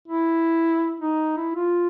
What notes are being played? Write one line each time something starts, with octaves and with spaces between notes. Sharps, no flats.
E4
D#4
E4
F4